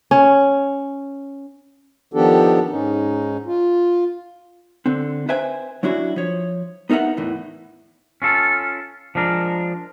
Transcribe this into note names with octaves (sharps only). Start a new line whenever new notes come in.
C#4
D#3 F3 B3 D4 G4 A4
G#2 C#4 D#4
F4
D3 C4
B4 C5 E5 G5 G#5
F#3 C#4 D4 E4 F#4
F3 C#5
B3 D#4 A#4 E5 F#5
E2 A2 E3
C#4 F4 A4
F3 G#3 D4 A#4